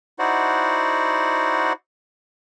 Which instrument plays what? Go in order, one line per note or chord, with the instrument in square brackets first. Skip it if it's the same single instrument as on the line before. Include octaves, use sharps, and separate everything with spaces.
[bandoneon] D#4 E4 F#4 C5 D5 F#5